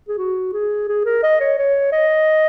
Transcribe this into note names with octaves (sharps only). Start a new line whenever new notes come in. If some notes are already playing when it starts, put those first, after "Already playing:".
G#4
F#4
G#4
G#4
A#4
D#5
C#5
C#5
D#5